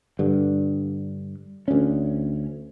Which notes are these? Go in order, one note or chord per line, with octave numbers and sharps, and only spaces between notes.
G2 D3
D2 C#4